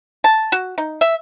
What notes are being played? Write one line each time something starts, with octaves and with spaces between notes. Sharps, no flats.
A5
F#4
D#4
E5